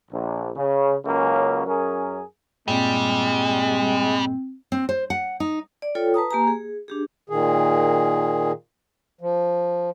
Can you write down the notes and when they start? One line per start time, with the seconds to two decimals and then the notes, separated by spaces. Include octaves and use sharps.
0.12 A#1
0.56 C#3
1.05 C#2 C#3 F#3 A#3 C#4
1.66 F#2 C#4 G#4 A#4
2.68 G2 A#2 G3 G#3 C4
4.72 C4
4.89 C5
5.10 F#5
5.40 D#4
5.82 D5
5.95 F4 A4 C#5 G5
6.14 B4 A5 A#5 D#6
6.31 A#3 G4 G#5 A#5
6.47 G#4
6.88 D4 G4 G#4
7.30 A#2 D#3 G#4
9.21 F3